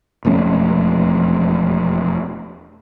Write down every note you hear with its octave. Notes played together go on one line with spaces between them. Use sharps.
E1 F2 A3 C#4